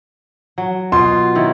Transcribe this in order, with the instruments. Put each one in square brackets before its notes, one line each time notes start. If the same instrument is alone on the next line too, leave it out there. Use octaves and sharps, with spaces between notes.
[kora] F#3
[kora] B2 [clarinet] F4 [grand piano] C6
[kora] D#3 E4 C#5